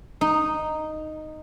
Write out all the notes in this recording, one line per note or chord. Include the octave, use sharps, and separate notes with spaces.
D#4